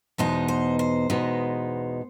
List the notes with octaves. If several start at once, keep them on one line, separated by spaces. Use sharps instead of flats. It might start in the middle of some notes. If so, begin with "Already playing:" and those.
E2 B2 G#3 B3 D#4 C5
C5
C5
E2 B2 G#3 B3 D#4